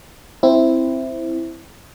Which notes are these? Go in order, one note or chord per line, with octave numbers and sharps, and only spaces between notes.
C4 E4